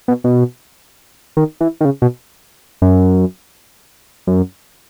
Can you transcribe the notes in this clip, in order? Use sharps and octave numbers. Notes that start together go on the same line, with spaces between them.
B2
B2
D#3
E3
D#3
C#3
B2
F#2
F#2